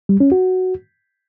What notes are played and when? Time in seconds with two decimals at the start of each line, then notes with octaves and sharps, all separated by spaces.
0.09 G3
0.20 C#4
0.32 F#4